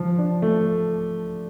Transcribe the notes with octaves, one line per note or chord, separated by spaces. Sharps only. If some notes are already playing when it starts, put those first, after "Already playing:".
Already playing: F3
D4
A3